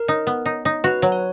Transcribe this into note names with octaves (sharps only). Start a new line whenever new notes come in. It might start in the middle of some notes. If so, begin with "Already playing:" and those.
Already playing: A#4
D#4
B3
D#4
D#4
F#4 B4
F#3
C#5